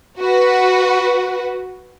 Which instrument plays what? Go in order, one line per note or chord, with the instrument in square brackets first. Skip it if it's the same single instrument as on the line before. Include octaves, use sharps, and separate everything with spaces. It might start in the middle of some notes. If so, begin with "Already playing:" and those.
[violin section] F#4 B4